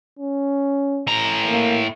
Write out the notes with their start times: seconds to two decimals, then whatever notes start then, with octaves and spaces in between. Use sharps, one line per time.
0.19 C#4
1.07 A2 A#5
1.47 A#3